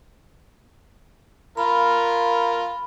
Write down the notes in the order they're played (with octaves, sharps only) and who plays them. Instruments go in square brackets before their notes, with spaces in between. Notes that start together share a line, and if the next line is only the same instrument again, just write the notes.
[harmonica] F4 A#4 [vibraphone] B5